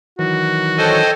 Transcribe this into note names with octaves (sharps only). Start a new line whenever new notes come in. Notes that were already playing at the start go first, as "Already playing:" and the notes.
D#3 E3 F#3 F#4
A4 C5 C#5 D#5 G5 G#5